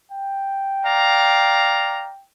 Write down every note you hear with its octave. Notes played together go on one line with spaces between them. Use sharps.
G5
D5 F5 A#5